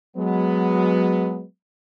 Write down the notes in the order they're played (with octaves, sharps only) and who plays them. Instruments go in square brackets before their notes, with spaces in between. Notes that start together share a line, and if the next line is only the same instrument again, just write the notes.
[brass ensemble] F#3 G#3 B3